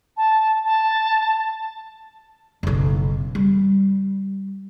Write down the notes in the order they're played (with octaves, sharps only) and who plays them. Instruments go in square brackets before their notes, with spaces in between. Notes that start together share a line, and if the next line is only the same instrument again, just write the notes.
[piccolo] A5
A5
[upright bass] F#1 B1
G3